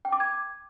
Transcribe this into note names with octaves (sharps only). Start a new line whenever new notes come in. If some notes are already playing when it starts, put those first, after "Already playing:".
G5
D6
G#6